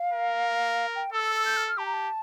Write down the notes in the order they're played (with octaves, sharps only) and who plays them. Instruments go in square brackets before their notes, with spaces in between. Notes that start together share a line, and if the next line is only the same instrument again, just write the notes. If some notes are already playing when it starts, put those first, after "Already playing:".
Already playing: [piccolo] F5
[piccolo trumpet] A#4
[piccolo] G5
[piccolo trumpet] A4 [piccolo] E6
[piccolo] E6
E6
G6
F6
F6
[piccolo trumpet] G4 [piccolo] A5
[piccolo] A#5
A5